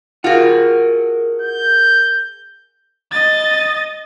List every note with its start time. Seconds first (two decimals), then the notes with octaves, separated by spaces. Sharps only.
0.24 F4 F#4 G#4 A#4 F#5
1.42 G6
3.11 D#5 A6